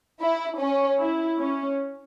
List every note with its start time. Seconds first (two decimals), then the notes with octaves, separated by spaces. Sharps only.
0.22 E4
0.61 C#4
1.00 E4
1.39 C#4